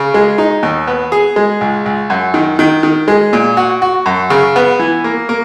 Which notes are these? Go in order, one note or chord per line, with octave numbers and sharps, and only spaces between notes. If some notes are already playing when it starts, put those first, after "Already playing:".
Already playing: C#3
G#3
D#4
D#2
B3
G#4
G#3
C#2
C#2
F#2
D#3
D#3
D#3
G#3
A#2
F#4
F#4
F#2
C#3
B3
E3
A#3
A#3